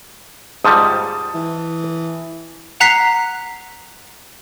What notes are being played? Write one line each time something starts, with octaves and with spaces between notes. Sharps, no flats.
G#2 F3 G3 A5 D#6
E3
F#5 A#5 F#6 B6 C7 F7